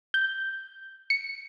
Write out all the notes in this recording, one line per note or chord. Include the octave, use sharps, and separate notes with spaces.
G6
C#7